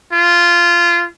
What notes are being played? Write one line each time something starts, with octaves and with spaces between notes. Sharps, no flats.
F4